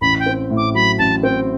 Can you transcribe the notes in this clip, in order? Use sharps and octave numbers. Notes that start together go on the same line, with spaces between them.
A1 B5
G5
C4
A2
D6
F#3 B5
A1 A5
C4 G5